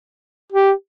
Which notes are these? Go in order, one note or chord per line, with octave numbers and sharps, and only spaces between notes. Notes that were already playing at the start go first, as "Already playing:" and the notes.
G4